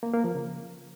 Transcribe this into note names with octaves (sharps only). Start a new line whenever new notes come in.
A#3
A#3
F3
C#3